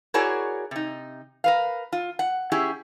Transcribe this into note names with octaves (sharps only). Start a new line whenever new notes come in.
E4 F#4 G#4 A#4 C#5 D5
C3 D#4
A#4 B4 F5
F4
F#5
C#4 E4 G4 G#4